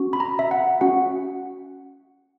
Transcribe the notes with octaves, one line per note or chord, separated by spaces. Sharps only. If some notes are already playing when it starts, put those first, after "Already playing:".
Already playing: C#4 F#4
B5
A#5
E5
F#5
C#4 F#4 F#5